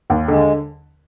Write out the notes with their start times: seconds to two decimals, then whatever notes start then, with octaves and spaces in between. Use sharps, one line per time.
0.10 D#2
0.28 D3 G#3